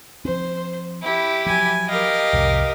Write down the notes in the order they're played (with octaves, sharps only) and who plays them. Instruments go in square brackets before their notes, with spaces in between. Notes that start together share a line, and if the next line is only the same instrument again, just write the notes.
[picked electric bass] F3 C4 [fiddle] C5
[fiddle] E4 G4
[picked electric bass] F3 F#3 [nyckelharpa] G#5
[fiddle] G4 A#4 [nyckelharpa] D#5 F5
[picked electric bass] C2 F2 A2